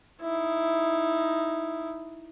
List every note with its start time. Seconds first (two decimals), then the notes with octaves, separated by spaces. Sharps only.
0.22 D#4 E4